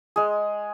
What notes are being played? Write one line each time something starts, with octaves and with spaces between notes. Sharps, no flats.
G#3 G#4